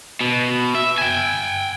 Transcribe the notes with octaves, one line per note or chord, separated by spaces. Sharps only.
B2
E5
G5 G#5